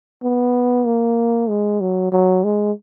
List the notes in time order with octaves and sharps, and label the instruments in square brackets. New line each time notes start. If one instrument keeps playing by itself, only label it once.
[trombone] B3
A#3
G#3
F#3
F#3
G#3